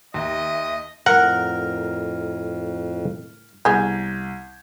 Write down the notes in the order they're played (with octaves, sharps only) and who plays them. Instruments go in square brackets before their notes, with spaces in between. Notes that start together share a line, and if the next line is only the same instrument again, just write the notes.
[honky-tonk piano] D#2 [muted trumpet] D#5 [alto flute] E5
[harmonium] F2 [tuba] A2 [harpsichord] A#4 [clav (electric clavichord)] F#5
[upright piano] C2 G6 G#6 [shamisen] B3 G#4